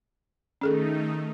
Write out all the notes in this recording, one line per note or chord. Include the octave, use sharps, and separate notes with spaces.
D#3 A3 C#4 D#4 G#4 A4